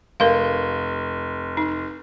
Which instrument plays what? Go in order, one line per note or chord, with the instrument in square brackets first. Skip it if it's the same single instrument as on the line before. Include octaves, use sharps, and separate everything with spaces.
[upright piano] F1 [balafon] A#4 F5
[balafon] D#4